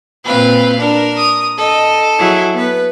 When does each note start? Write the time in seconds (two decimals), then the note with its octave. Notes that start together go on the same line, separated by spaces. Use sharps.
0.24 A#2 C4 B4 F5
0.80 D4 A#4
1.17 D#6
1.58 A4 D#5
2.18 F#3 E4 G#4
2.53 B3 B4